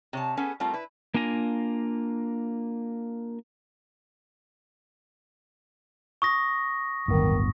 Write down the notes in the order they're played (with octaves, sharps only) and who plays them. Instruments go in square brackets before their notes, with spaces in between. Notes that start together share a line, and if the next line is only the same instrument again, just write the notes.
[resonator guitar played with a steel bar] C3 C#5 A5
B3 C#4 G#4 A4 G#5
G3 A3 C4 F4 A#4
E4 B4
[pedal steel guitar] A#3 D4 F4 G#5 A#5
[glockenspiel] C#6 D#6 A#6
[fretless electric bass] D1 G1 B3 [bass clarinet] D#3